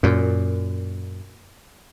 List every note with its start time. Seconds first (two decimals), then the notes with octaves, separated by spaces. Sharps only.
0.03 F#2 A#2